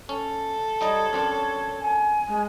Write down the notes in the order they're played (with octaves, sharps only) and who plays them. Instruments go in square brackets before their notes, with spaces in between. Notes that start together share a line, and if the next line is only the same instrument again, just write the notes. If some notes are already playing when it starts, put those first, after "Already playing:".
[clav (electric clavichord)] C#4 [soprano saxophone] A4
[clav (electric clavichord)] G3 D#4 D#5 [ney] C#5
[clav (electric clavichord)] F#2 C4 D4
[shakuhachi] G#5
[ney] G#3